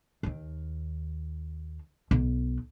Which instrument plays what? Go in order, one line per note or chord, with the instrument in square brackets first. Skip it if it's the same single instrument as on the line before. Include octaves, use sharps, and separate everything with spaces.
[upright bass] D#2 D#3
B1